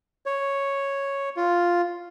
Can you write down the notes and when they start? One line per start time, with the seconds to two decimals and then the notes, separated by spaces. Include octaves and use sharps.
0.26 C#5
1.36 F4